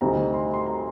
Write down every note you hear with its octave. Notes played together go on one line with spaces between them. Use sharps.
D2 C3 G3 C4 D#4 A#5
C6
C6
A#5